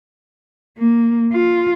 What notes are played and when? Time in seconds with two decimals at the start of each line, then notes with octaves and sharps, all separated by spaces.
0.78 A#3
1.33 F4